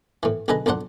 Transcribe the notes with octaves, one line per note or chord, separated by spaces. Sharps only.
A2 E3
B1 D3 G#4 B4 D#5
B1 F2 D4 C5 F#5